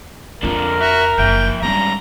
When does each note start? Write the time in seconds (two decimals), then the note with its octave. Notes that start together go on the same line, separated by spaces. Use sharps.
0.43 F2 D3 F3 D4 F4 A#4
0.80 F#4 E5
1.18 F#1 F3 E5 G5
1.62 G#2 G3 B3 C#4 D4 A#5